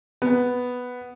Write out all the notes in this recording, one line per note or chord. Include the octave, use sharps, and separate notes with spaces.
B3